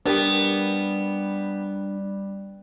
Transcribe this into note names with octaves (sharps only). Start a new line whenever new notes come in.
G3 B3 D4 G4 A#4